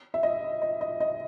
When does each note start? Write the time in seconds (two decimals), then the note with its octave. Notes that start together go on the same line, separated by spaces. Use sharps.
0.14 E5
0.23 D#5
0.62 D#5
0.81 D#5
1.00 D#5